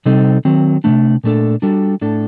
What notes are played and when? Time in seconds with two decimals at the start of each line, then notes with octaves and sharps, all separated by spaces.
0.06 C3 G3 C4 D#4 A4
0.45 D#3 F#3 C4
0.84 C3 D#3 A3 D4
1.24 A#2 A3 D4 A4
1.62 G3 D4 F#4 A4
2.01 A2 A3 D4 A4